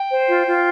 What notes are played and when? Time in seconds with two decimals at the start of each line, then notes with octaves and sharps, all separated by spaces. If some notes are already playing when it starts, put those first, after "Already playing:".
Already playing: G5
0.10 C5
0.28 F4
0.46 F4